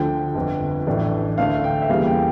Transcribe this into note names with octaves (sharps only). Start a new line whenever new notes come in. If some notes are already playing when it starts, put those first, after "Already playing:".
Already playing: D2 D3 F3 G5
G1 F2 D3
A1 A2 E3 A3 D4
D2 D3 A3 D4 F5
G5
E5
E2 C#3 E3 G3 A#3 F5
G5